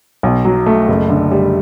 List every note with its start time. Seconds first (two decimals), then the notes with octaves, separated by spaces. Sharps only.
0.23 B1
0.45 F#3
0.66 A3
0.88 F#1
1.10 D3
1.31 G3